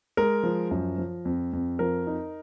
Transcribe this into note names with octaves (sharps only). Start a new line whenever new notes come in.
G#3 A#4
F3
F#2
F3
F2
F2
F3 A#4
D#4